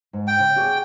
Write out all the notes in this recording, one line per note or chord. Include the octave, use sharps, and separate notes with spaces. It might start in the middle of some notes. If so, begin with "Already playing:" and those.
G#2
G5
C#3
F#4 G#4 D5